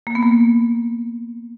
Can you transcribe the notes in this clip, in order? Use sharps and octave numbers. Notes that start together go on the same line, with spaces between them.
A#3
B3
A#3